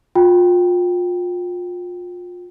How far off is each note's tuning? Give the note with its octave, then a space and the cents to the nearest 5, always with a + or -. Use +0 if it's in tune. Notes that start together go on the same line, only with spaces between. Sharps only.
F4 +30 G5 +0 A#5 +40